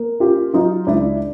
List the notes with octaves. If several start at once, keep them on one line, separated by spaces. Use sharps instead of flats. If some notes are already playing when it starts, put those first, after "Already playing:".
Already playing: A#3
C#4 F4 G4
F#3 D#4 F4
C#2 D4 E4